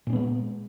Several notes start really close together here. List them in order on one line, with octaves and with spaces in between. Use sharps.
A#2 C#4 B3 G#3